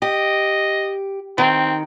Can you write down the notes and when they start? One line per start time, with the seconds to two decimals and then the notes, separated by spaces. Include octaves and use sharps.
0.02 G4 D#5
1.38 D#3 C4